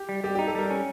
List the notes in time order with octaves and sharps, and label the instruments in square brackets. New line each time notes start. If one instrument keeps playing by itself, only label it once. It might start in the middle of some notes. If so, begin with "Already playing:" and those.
Already playing: [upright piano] G4
[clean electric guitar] G3
[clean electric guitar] G3 [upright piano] G4
[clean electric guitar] D#4 [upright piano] G4
[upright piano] A4
[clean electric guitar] G3 [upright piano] A#4
[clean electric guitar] C#4